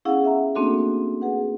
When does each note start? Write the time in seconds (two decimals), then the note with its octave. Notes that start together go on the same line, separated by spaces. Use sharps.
0.05 B3 C#4 E4 G#4 F5 F#5
0.24 E5 F#5 A#5
0.55 A3 A#3 C4 D4 F#4 A4
1.22 G#4 B4 F#5